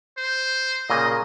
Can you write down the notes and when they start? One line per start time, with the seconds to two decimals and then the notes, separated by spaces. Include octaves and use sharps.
0.17 C5
0.90 A#2 C#3 A#3 D#5